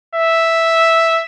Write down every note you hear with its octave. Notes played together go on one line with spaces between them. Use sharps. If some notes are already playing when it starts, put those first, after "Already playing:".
E5